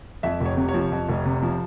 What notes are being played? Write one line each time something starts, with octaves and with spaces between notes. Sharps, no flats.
F2 E5
F1
C#5
C3
C#5
F3
F2
F1
C3
F3